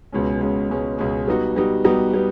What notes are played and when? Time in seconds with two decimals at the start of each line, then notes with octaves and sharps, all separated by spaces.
0.12 C#2 B2 G#3 C#4
0.41 C#2 B2 G#3 C#4
0.69 C#2 B2 G#3 C#4
0.98 C#2 B2 G#3 C#4
1.27 G3 B3 D#4 F#4
1.56 G3 B3 D#4 F#4
1.84 G3 B3 D#4 F#4
2.14 G3 B3